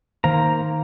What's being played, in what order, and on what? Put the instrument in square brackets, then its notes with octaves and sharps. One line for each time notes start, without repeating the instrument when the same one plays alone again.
[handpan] D#3 C5 [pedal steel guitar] A#3 F5 A#5